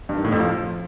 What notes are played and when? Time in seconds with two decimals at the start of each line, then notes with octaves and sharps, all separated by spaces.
0.09 G2
0.17 D#3
0.24 A2
0.32 F2
0.40 F3